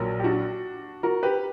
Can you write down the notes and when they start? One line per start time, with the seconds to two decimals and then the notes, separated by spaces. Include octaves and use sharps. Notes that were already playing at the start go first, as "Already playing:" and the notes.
Already playing: A#1 A#2 F#3 A#4
0.19 G4
0.24 D4 F#4
1.03 F#4 A#4
1.23 G4 B4